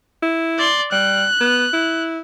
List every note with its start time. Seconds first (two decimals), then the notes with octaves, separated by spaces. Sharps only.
0.22 E4
0.58 D5 C6
0.92 G3 F#6
1.40 B3
1.73 E4